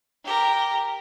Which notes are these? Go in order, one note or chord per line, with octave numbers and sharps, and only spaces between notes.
G4 A#4